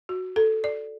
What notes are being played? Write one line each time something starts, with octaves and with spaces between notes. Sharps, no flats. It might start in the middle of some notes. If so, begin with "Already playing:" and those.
F#4
A4
D5